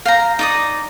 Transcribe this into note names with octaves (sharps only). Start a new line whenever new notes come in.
F5 G5 A#5
D#4 D5 D#6